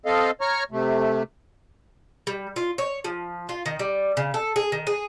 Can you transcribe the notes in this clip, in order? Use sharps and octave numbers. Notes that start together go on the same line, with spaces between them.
C4 A4 D#5 F5
C#5 A#5 C#6 F6
C3 A3
G3
F4
C#5
F3
F4
D#3
G3
C#3
A4
G#4
D#3
G#4